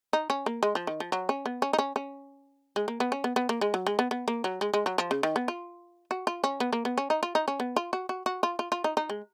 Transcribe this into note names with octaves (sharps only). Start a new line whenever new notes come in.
D#4
C#4
A#3
G#3
F3
D#3
F3
F#3
C#4
B3
C#4
D#4
C#4
C#4
G#3
A#3
B3
C#4
B3
B3
A#3
G#3
F#3
G#3
B3
B3
A#3
F#3
G#3
G#3
F#3
F3
C#3
D#3
B3
F4
F#4
F4
C#4
B3
A#3
B3
C#4
D#4
F4
D#4
C#4
B3
F4
F#4
F#4
F#4
F4
F4
F4
D#4
D#4
G#3